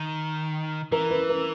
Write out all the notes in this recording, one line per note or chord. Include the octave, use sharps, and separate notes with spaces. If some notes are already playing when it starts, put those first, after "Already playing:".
Already playing: D#3
E3 A#4
B4
A#4